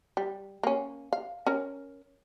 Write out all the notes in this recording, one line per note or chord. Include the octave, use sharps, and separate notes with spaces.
G3
A#3 C#4
F5
C#4 A#4